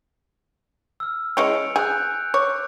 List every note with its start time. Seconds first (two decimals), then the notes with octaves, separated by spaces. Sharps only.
1.00 E6 F6
1.37 E3 G#3 C#4 C#7 D7 F7
1.76 G#4 F#6 G6
2.34 C#5 D6